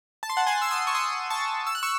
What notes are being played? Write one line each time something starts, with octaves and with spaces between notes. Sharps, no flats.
A5
C6
F#5 A5
G#5 C6
E6
C6 D#6
C#6
C6 D#6
A5 C#6
E6
F#6
C#6 E6